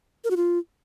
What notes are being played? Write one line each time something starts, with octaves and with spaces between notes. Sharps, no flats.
A#4
F#4
F4